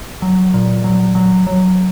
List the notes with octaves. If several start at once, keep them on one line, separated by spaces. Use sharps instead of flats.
F#3
A#2
F#3
F#3
F#3